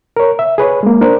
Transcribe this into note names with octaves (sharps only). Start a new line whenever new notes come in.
A#4 C#5
E5
G#4 B4 C#5
G#3 A#3
D4 A#4 C5